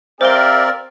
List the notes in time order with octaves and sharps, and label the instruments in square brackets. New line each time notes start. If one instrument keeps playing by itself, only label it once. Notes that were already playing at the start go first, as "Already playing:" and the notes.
[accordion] C4 A#4 D5 [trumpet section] G4 E5 F5 [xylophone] C5 G7